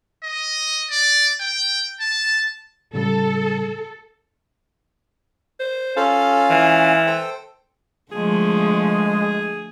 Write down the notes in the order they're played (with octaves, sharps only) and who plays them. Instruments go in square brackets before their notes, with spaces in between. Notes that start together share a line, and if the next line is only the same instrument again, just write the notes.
[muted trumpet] D#5
D5
G5
A5
[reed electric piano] A2 C#3 G3 [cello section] A4
[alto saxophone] C5
[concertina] C#4 F4 F5 [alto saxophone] A4
[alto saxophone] E3
[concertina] A4 C5 G5
[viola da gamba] D3 F3 A3 [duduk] G#3 [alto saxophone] G#4